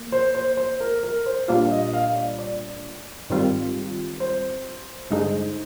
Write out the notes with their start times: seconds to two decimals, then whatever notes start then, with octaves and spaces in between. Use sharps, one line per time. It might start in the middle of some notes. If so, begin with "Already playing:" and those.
Already playing: A#3
0.12 C5
0.35 C5
0.57 C5
0.80 A#4
1.03 A#4
1.26 C5
1.48 A#2 G3 A#3 D4 F4 F5
1.71 D#5
1.93 F5
2.16 D5
2.39 D5
3.30 G#2 D#3 G3 C4 F4
4.20 C5
5.10 G2 D3 G#3 D#4